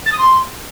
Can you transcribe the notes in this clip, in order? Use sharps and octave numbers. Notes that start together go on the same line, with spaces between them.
A6
D#6
C6